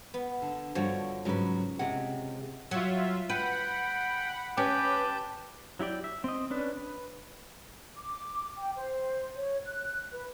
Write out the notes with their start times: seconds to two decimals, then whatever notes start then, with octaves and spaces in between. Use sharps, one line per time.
0.14 B3
0.42 D3
0.75 G2 D3 F3 F#4 C#5
1.25 G#2 C#3 F#3 B4
1.79 C3 G#3 F#5
2.71 F#3 F4 E5
3.29 B4 F#5 G5 B5
4.57 C#4 G4 B4 A5 G6
5.79 F#3 E4 G4 D5 G5
6.04 E5
6.24 C4 D#5
6.50 C#4 D4 B4
6.77 B4
7.97 D6
8.57 G5
8.76 C5
9.37 C#5
9.66 F#6
10.12 B4